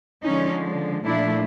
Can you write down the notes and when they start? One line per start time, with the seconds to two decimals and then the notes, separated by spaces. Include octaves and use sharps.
0.23 D3 F3 G#3 C#4 D#4
1.05 A#2 F3 A3 D4 E4